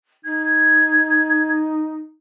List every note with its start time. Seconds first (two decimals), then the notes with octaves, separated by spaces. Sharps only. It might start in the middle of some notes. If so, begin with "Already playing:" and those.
0.25 D#4 G#6